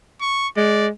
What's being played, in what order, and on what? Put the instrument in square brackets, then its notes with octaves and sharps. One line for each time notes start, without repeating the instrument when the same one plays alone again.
[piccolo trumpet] C#6
[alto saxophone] G#3 [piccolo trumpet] D5